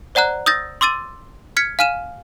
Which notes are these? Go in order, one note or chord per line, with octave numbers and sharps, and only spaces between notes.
C5 D5 F#5 A#5 F#6
D#6 E6 G6 A6 A#6
C6 D6 E6 A6 D#7
F6 G#6 B6 C#7
F5 G#5 F6 D#7 E7